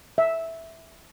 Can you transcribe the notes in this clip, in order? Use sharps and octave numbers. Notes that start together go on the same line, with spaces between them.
E5